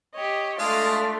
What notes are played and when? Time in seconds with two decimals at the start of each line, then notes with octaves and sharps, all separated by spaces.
0.14 G4 C#5 D#5
0.59 G#3 A3 D4 F4 D#5 F5